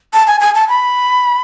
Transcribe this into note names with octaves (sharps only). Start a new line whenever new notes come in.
A5
G#5
G#5
A5
B5